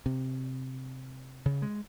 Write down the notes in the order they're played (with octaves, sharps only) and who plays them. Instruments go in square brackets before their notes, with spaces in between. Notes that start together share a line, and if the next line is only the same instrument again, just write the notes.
[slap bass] C3
C#3
G#3